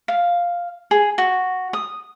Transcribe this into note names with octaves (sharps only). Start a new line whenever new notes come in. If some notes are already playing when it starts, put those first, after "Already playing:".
F5
G#4
F#4
D#6